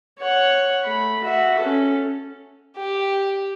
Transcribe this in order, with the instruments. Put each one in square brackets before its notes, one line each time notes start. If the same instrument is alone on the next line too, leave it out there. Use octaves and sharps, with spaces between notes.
[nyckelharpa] C#5 F#5
A3 B5
F#4 E5
C#4 A4
[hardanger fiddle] G4